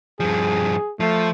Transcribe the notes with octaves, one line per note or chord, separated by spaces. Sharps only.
G2 F3 G#4
F3 A3